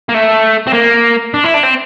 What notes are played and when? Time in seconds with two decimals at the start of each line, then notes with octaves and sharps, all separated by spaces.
0.09 A#3
0.14 A3
0.67 C4
0.74 A#3
1.34 D4
1.44 E4
1.54 D4
1.63 C4